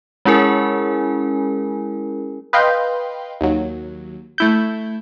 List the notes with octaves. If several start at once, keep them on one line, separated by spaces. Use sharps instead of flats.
G#3 C#4 E4 G#4 A#4 G#5
B4 D#5 F5 G5 C6 G6
D#2 F#3
A3 E4 G6